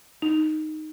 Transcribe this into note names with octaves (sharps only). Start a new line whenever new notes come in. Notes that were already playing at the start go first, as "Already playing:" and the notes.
D#4